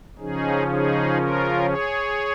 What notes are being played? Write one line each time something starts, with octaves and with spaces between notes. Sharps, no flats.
C#3 F3 C#4 D#4 G#4
D#4 G#4
F4 A#4
G#4 C#5